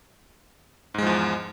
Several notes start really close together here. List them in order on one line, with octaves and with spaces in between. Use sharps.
G#2 G#3 F3 E2